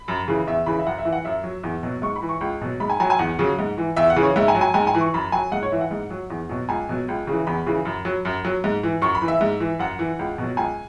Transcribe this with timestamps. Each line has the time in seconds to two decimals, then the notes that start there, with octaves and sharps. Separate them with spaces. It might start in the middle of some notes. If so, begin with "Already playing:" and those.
Already playing: B5
0.08 F#2
0.28 C#3 E3
0.47 E2 E5
0.66 C#3 E3 B5
0.79 E5
0.86 F#2 F#5
0.98 E5
1.05 E3
1.12 F#5
1.25 F#2 E5
1.44 F#3
1.64 E2
1.83 B2 F#3
2.02 G#2 C#6
2.16 B5
2.22 E3
2.29 C#6
2.41 C#2
2.61 B2 F#3
2.80 G#2 B5
2.90 G#5
3.00 F#3 G#5
3.10 G#5
3.19 E2 F#5
3.39 C#3 F#3
3.59 G#2
3.78 E3
3.96 E2 E5
4.10 F#5
4.16 C#3 E3
4.23 C#5
4.36 G#2 E5
4.48 G#5
4.55 F#3
4.61 G#5
4.74 G#2 G#5
4.87 G#5
4.95 E3
5.01 C#6
5.14 F#2 B5
5.32 F#3 G#5
5.52 G#2 F#5
5.63 C#5
5.72 E3 E5
5.81 F#5
5.91 G#2
6.10 F#3
6.30 E2
6.49 B2 F#3
6.69 C#2 G#5
6.89 B2 F#3
7.09 C#2
7.27 C#3 E3
7.47 E2 B5
7.67 C#3 E3
7.85 F#2
8.05 F#3
8.25 F#2
8.45 F#3
8.64 G#2
8.83 E3
9.02 F#2 C#6
9.15 B5
9.21 E3
9.28 E5
9.41 G#2
9.60 E3
9.79 F#2 F#5
9.99 E3
10.19 C#2
10.38 B2 F#3
10.57 C#2 G#5